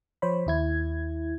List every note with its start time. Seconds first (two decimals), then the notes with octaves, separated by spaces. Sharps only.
0.22 F3 C5 C#5 B5
0.47 D#2 E4 G#6